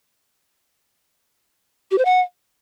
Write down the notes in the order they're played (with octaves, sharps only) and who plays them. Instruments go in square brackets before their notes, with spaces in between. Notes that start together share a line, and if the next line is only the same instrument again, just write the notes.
[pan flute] G4
C5
F#5